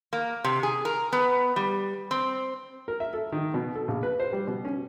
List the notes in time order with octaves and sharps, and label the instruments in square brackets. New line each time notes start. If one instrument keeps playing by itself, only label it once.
[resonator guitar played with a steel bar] A#3
C3
G#4
A#4
B3
G3
C4
[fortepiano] A#4
E5
A4
D#3
B2
A4
A#1
B4
C5
G3
B2
C#4